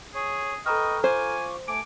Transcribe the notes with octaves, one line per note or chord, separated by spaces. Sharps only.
G#4 C#5
A4 B4 D#5 G5 A#5 C#6 F6
F4 C5 G#5 C#6 D6
A3 G#5 D6 D7